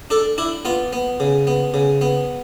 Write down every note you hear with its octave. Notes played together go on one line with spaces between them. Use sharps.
D4 A4
D4 E4
B3 F4
B3
C#3
B3
C#3
B3